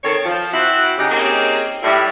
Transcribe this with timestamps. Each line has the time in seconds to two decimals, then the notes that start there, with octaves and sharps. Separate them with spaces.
0.03 D#3 C4 A4 C#5
0.25 F3
0.52 C4 E4 F#4
0.98 C#3 D#4 G4
1.11 A#3 C4 C#4 D#4 G4 G#4
1.83 A2 G3 E4